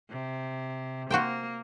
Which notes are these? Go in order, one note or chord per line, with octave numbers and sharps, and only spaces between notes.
C3
A#3 F#4 C5 G5